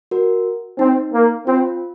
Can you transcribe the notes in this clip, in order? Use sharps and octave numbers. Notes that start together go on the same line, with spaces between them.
F#4 A#4
C4 D#4
A#3
C4 F4